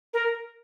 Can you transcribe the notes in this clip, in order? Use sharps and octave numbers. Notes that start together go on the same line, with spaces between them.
A#4